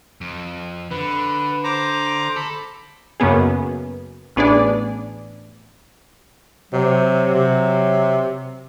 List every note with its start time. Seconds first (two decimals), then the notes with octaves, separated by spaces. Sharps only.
0.21 F2
0.91 D3 B4
1.64 C5 A#5 D6
2.36 A4 B5
3.20 F#2 C#3 A#3 B3 G#4
4.36 A1 B3 D4 G#4 D5
6.73 C3 F#3
7.34 C3